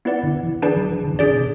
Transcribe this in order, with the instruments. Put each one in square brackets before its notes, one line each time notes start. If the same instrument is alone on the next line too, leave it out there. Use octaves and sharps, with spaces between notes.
[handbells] B3 E4 B4 D5 F#5
[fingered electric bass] D3
E3
[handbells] D4 G#4 B4 D5 A5
[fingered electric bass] F#3
E3
D3
B2
[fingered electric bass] C#3 [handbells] D4 G#4 D5
[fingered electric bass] B2